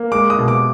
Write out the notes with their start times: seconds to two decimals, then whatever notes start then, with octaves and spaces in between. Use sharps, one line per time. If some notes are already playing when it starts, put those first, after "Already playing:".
Already playing: A#3
0.12 G#3 D6
0.30 D#6
0.39 B2
0.48 D6